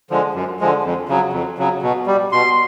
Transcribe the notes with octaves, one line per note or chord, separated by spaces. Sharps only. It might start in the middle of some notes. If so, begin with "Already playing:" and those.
D3 F3 G#3
F#2
D3 F3 G#3
F2
C#3 F#3
F2
C#3 F#3
B2
G3
B2 C6